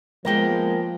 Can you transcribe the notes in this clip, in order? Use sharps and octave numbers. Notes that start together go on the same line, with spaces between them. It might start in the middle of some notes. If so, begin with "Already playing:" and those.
F3 G#3 A#3 B3 A#4 G5